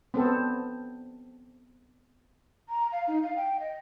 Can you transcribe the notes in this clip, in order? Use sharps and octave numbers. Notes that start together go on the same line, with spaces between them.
B3 C4 A4
A#5
F5
D#4
F5
G5
D#5